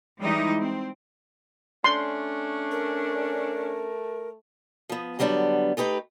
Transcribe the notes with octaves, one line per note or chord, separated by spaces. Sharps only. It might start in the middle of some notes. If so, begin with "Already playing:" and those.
E3 G3 G#3 D#4 E4
C4
A3 C#4 D4 C6
A#4
F3 B3
D3 F#3 G3 B3 D4
A3 D#4 G4 B4